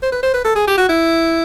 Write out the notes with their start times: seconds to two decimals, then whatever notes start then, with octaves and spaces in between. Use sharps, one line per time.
0.02 C5
0.12 B4
0.23 C5
0.34 B4
0.44 A4
0.55 G#4
0.67 G4
0.78 F#4
0.89 E4